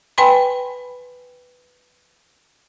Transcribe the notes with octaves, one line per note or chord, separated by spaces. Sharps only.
B4 G5 G#5 B5 C6